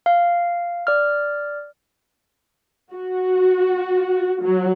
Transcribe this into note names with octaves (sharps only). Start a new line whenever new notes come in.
F5
D5 F6
F#4
F#3